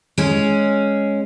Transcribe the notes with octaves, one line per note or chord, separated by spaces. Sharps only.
G#3 C#4